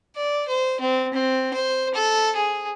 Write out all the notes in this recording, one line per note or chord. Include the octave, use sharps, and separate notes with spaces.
D5
C5
C4
C4
C5
A4
G#4